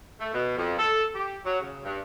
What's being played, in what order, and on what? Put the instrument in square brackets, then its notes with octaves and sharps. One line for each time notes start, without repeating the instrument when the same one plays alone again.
[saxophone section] A3
B2
F2
A4
G4
F#3
C#3
G2